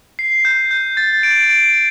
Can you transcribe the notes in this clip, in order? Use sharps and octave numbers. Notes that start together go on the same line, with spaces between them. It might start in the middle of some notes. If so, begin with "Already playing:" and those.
C7
G6
G6
A6
D7
D7